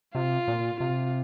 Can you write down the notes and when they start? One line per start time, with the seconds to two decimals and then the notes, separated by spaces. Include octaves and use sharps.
0.14 C3 F4
0.48 A#2
0.80 C3 F4